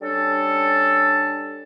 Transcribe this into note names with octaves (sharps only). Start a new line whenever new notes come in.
G3 C#4 D4 A4